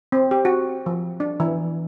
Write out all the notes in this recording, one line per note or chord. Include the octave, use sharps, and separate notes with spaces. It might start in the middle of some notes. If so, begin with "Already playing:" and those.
C4
G4
F#4
F3
D4
E3